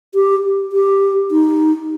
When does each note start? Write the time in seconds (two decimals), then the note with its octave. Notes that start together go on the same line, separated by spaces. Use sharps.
0.15 G4
0.72 G4
1.31 D#4